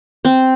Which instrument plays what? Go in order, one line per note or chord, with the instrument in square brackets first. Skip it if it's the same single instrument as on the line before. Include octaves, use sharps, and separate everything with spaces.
[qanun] C4